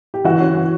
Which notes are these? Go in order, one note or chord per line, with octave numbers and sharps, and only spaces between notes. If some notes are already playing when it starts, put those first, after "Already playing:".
G4
E3 F#4
C#4
E3